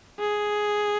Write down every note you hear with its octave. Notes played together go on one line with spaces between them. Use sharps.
G#4